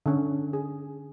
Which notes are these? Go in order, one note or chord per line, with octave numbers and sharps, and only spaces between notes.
D3 C#4
G#4